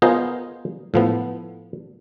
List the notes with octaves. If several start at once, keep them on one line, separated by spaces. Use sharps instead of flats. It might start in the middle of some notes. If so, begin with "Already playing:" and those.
B3 F4 G#4 A#4 C5 D#5
A2 F3 B3